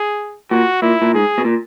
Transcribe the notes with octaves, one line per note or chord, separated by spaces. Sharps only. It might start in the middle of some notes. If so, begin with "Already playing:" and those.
Already playing: G#4
A#2 F#4
A#2 E4
A#2
G#2 G#4
B2
A#2